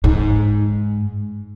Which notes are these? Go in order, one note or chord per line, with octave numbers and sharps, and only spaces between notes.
G#2